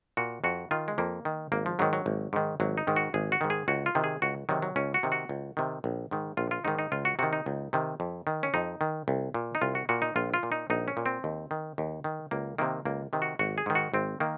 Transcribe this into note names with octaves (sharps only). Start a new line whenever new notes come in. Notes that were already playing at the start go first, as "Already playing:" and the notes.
A#2 F#4
F2 F#4
D#3 F4
G#3
F2 A#3
D#3
G#1 A#3
F3
G#2 D#3 F#3
F#3
G#1
G#2 D#3
G#1 F#3
D#4
G#2 D#3
F#4
G#1 G#4
F#4
G#2 D#3
G#4
C#2 F#4
F4
C3 D#3
G#4
C#2 F#4
C3 D#3 F#3
F#3
C#2 C#4
F#4
C3 D#3
F#4
C#2
C3 D#3
A#1
G#2 D#3
A#1 F4
F4
G#2 D#3 D#4
D#4
C#2 F4
F#4
C3 D#3 F#4
D#4
C#2
C3 D#3
F2
D#3
C#4
F2 D#4
D#3
C2
A#2
D#4
C2 F4
F#4
A#2 F#4
D#4
A#1 F4
F4
A#2
D#4
A#1 D#4
C#4
A#2
C4
D#2
D#3
D#2
D#3
C#2 A#3
C3 D#3 A#3
C#2 A#3
C3 D#3
F#4
G#1 F#4
G#4
G#2 D#3
F#4
G#1 C4
D#3 A#3